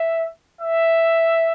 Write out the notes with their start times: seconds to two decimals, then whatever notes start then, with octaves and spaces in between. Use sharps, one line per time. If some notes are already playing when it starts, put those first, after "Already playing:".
Already playing: E5
0.61 E5